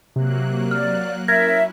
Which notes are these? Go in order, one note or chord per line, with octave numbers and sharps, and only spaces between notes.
C3 F#3 A#3 F#6
D5 F6
C#4 E4 A#4 E5 G#6 A#6